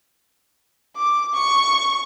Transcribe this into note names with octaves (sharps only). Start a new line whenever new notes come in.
D6
C#6